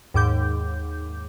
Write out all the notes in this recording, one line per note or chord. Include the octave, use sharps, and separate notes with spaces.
D#2 G#2 D6 G6